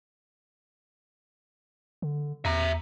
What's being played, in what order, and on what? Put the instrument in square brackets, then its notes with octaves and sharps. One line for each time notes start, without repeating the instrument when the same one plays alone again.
[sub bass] D3
[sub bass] E2 [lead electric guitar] E5 A#5